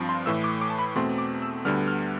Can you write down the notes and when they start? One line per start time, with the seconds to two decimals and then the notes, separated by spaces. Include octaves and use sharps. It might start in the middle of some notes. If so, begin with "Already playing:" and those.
Already playing: G2 F3 C4
0.09 C6
0.26 A2 E3 A3 E6
0.44 D6
0.61 D6
0.70 A5
0.79 B5
0.96 E2 B2 A3 C4 C6
1.18 D6
1.42 E6
1.65 D2 D3 G3 B3 F6
1.88 F6